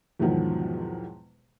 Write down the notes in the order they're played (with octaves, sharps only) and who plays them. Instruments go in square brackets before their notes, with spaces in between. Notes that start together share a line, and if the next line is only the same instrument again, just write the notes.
[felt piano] E2 G#2 B2 D#3 F3 F#3